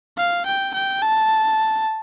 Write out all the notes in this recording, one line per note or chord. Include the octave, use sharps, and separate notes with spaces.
F5
G5
G5
A5